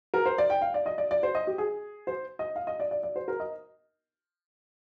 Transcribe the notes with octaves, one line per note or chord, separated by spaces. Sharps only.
A#4
C5
D5
G5
F5
D5
D#5
D5
D5
C5
D#5
G4
G#4
C5
D#5
F5
D#5
D5
D5
D5
C5
A#4
D#5